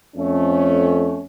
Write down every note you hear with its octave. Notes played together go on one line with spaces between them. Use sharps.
F2 A3 C#4